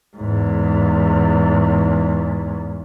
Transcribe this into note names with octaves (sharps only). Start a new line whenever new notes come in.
E2 G#2